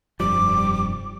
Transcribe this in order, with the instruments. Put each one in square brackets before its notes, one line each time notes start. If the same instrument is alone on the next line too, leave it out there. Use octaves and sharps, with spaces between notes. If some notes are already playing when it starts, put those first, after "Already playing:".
[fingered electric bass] F1 G2 F3 [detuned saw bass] G3 [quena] D6